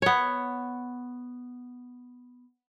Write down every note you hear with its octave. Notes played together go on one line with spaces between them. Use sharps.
B3 C#5